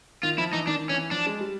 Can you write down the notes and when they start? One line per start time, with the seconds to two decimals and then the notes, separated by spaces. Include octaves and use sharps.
0.23 D#3 F4
0.38 F3 E4
0.53 E3 D#4
0.67 D#3 D4
0.89 E3 C#4
1.11 F3 D4
1.27 G#3
1.40 G3